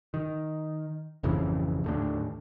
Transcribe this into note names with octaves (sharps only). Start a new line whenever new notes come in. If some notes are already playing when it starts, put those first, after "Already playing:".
D#3
G#1 F2 C#3 E3
D#2 A2 D3